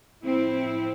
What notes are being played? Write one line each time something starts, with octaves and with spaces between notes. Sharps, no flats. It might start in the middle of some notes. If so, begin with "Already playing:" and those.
A2 F3 C4 E4